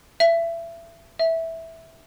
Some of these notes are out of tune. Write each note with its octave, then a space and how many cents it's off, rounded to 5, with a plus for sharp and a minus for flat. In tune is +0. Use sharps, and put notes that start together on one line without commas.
E5 +30
E5 -10